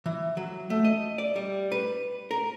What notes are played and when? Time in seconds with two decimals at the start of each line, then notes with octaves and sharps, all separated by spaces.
0.06 E3
0.37 F#3
0.70 A3
0.84 D#5
1.18 D5
1.36 G3
1.72 B4
2.31 A#4